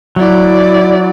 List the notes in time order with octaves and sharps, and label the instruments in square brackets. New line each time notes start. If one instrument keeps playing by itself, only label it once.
[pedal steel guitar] F#3 [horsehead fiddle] E4 D5